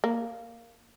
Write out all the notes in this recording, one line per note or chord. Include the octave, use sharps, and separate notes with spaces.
A#3